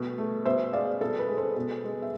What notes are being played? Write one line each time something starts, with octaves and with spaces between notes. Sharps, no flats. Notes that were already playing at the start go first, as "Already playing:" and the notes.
Already playing: B2 A3
A3
B2 C5 E5
G#3 D5 F5
B2 A4
B4
G#3
A4 C5
B2
G#3
E5